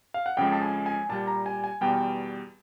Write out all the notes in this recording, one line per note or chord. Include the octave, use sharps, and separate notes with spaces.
F5
F#5
F2 C#3 F3 G#3 G5
A5
G#5
G#5
A#2 G3 A5
A#5
G#5
G#5
E2 B2 G3 G5